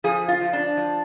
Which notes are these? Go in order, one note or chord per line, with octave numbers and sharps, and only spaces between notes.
F3 G#4
F4
F3
D4
F3